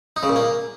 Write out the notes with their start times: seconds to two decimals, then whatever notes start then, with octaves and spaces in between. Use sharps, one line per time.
0.16 D#4
0.23 C#3
0.29 A#2
0.36 A#3